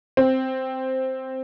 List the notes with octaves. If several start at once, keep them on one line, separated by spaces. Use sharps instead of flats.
C4